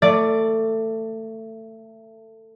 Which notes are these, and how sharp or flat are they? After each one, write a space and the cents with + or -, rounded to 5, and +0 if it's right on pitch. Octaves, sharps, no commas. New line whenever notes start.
A3 +20 D5 +0